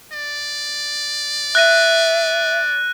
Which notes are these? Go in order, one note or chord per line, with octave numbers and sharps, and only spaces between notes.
D5
E5 F#6 A#6 D#7